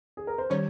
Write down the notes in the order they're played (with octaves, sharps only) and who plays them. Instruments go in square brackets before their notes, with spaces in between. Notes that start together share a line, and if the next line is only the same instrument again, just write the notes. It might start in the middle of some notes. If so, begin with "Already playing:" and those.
[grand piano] G#4
A#4
C5
[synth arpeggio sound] D#3 G3 C#4 [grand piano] C#5